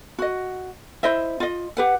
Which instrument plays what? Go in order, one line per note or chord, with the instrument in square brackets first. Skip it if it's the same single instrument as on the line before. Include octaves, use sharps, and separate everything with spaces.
[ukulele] F#4 D#5
E4 C5 D#5 E5
F4 D#5
G4 B4 F#5